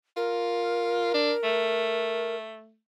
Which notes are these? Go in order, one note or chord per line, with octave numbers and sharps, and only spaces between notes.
F4 A#4
D4
A3